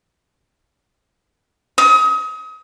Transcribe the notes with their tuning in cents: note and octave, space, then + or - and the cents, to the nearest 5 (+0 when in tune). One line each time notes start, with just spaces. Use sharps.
D#6 +35